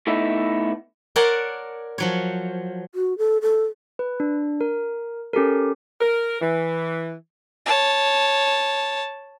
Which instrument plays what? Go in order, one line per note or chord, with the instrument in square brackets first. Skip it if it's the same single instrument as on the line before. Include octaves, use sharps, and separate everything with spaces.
[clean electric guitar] A2 A3 B3 D#4 E4
[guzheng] A#4 C#5 D5 F#5 A5 C6
F3 F#3 C#5
[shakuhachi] F#4
A4
A4
[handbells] B4
D4
A#4
C#4 G4 A4 A#4
[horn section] A#4
E3
[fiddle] C#5 A5